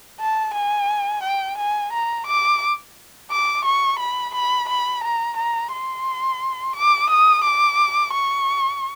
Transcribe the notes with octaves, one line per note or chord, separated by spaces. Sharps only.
A5
G#5
G5
G#5
A#5
D6
D6
C#6
B5
B5
B5
A#5
A#5
C6
D6
D#6
D6
C#6